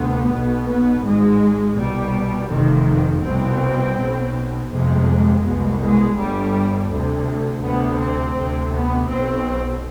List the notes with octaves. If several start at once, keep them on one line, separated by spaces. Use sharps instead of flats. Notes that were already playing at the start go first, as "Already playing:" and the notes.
Already playing: D2 C3 B3
B1 B2
B3
G#1 G#2 G#3
C2 B2 G3
F1 F2 C3 D#3
C2 B2 C4
B1 B2
G1 F2 C3 G#3
C2 B2
G#3
G1 G2 G3
D2 C3
D2 C3 B3
C4
D2 C3
B3
B1 B2 C4